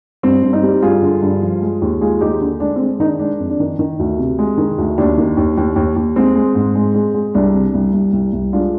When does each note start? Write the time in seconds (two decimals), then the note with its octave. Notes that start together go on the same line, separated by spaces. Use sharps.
0.23 G2 C4
0.43 G2
0.53 C4 D#4
0.63 G3
0.82 G2 F4 G#4
1.02 D3
1.22 G2
1.41 F3
1.62 G#3
1.82 D#2
2.01 G#3 F4 G#4
2.21 D#2 D#4 G4
2.41 D3
2.60 G#3 D4
2.76 G#3 C4
3.00 D#3 D#4
3.04 D4
3.19 G#3 D4
3.39 F2
3.50 D4
3.60 D#3
3.79 D#3
3.99 D2
4.18 C3
4.39 G#3
4.58 D#3
4.78 D2
4.98 D#2 D4
5.18 D#3
5.37 D#2
5.57 D#2
5.76 D#2
5.96 D#2
6.16 G#3 C4
6.35 G#3
6.55 G#2
6.75 G#3
6.95 G#3
7.14 G#3
7.34 C2 D4
7.54 C3
7.74 C2
7.94 C2
8.13 C2
8.33 C2
8.53 G#3 D4 F4